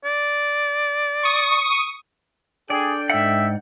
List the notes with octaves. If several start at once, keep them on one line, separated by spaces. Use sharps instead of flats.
D5
C#6 D#6
D4 G#4 A4 D5 G5
G#2 E5 F#5